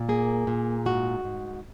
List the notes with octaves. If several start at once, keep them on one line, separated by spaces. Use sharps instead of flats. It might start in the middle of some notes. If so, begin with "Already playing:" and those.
Already playing: A#2
A#3 G#4
A#2
G#2 F#4
G#2